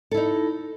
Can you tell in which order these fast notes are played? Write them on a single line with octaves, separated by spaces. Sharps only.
A4 E4 D#4